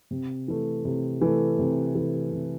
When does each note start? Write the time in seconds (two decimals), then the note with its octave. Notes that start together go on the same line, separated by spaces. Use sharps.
0.11 C3
0.48 E3 A3
0.85 C3
1.21 E3 A3
1.59 C3
1.95 E3 A3
2.32 C3